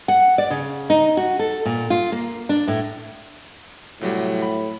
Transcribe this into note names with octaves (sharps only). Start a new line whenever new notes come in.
F#5
D5
C#3
D#4
F#4
A4
A#2
F4
A#3
D4
A2
C2 A2 F#3 G3
B5